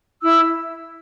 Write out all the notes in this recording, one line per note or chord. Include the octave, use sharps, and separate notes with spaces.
E4 E6